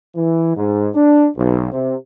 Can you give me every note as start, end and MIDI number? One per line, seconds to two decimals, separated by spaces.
0.15 0.52 52
0.56 0.88 44
0.94 1.26 62
1.36 1.70 35
1.71 1.95 48